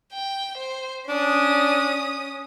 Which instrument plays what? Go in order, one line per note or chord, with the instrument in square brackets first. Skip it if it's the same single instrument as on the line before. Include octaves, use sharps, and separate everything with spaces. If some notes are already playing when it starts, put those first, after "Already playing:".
[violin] G5
C5
[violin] C#4 D#6 [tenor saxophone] D4